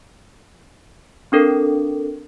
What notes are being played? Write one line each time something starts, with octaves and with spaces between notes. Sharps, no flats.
C4 D4 A4 A#4